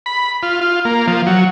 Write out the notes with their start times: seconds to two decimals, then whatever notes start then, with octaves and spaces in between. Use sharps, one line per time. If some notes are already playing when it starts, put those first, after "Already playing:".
0.06 B5
0.43 F4
0.61 F4
0.85 A#3
1.08 F3
1.27 F#3